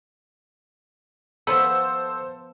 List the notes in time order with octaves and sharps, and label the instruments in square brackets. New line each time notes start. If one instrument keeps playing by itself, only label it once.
[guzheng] F3 B3 [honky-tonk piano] A4 C5 [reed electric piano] E6